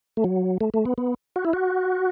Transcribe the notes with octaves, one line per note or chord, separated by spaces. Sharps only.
A3
F#3
A3
A3
B3
B3
F#4
E4
F#4